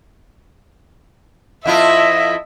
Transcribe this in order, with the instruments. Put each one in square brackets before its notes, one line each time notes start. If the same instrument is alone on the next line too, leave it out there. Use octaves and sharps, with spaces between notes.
[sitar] F2 E4 F4 [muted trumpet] D#5 [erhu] E5